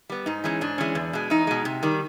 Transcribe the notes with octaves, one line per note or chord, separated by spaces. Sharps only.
G3 B3
G#2 D#4
E3 G#3 C#4
G#2 D4
E3 G#3 C#4
E2
B2 G#3
E2 D#4
B2 G#3
C3
D#3 G3